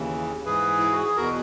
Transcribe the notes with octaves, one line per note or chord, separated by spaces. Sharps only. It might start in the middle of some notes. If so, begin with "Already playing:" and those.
Already playing: D#2 C#3 E3
G#2 E3 G#4 B4
E4
F#4
G#4
E2 B2 F#4 A#4